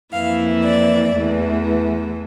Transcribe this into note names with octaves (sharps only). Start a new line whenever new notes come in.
F2 E3 A#3 E4 F5
D5
E2 E3 A3